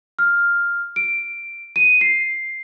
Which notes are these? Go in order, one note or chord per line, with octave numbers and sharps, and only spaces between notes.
F6
D7
D#7
C7